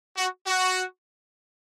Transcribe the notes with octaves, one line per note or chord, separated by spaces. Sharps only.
F#4
F#4